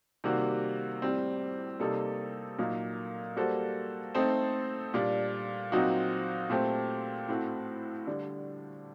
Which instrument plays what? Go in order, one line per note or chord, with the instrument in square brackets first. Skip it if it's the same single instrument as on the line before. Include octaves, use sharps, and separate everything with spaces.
[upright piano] C3 D#3 G3 A#3 F#4
A2 G3 C4
C3 G3 A#3 D#4 A4
A#2 F#3 A#3 D#4
G3 A#3 F#4 A4 C5
A3 C4 D#4 A4 C5
A#2 G3 D4
A#2 F#3 C4 D#4 F#4
A#2 A3 C4 G4 C5
A2 A3 C4 F#4
D3 G3 D4